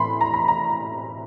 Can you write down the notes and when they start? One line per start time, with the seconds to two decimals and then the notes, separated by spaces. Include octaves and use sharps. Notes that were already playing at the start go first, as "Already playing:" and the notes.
Already playing: A2 E3 B5 C6
0.21 A#5
0.34 B5
0.48 A#5